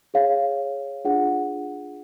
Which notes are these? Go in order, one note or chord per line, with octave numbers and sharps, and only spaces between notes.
G#4 C#5 F5
D4 F4 G#4 F#5